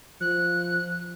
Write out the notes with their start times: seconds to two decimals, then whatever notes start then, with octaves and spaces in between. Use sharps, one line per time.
0.21 F3 F#6